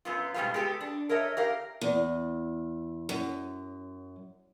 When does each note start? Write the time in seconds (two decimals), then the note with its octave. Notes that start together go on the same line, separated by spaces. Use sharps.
0.05 F#2 B3 F4
0.34 G#2 B2 D#3 G3 B3 F5
0.54 G#3 B3 G4 A4
0.81 D4
1.09 A#4 C#5 D#5 E5
1.37 G4 A#4 F5
1.81 E2
3.09 F#2